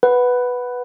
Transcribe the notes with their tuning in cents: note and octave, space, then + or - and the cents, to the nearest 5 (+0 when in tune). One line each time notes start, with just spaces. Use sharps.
B4 +0 F#5 +0